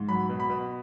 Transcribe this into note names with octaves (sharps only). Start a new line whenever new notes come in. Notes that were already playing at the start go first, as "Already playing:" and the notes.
Already playing: G#2
F#3 B5
B2
B5
B2